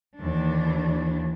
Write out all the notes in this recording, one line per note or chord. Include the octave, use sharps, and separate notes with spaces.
D#2 E3 D4